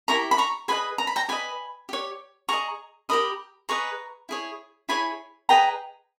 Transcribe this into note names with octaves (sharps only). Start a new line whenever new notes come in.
E4 G4 A#4 A#5 C#6
B5
A#5 C#6
G#4 B4 D#5 G#5 B5
A#5
B5
G5 A#5
G4 B4 D#5 G#5 B5
G4 C#5
G#4 D#5 A#5 C#6
G4 A#4 D#5 B5 D#6
G#4 B4 D#5 A#5 C#6
E4 G#4 C#5
E4 G#4 C#5 G#5 B5
G#4 B4 D#5 G5 A#5